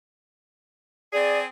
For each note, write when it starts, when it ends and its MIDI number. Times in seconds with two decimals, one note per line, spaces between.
1.13 1.44 60
1.13 1.44 68
1.13 1.39 74